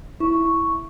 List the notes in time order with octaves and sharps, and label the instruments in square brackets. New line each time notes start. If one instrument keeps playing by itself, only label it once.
[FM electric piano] E4 [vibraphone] C#6